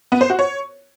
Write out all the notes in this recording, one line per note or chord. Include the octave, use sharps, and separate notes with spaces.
B3
C5
F#4
C#5